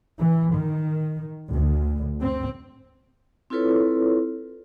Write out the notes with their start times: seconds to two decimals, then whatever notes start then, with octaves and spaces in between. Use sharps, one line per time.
0.19 E3
0.55 D#3
1.52 D2
2.21 C4
3.50 C4 E4 F4 A4 B4 C#5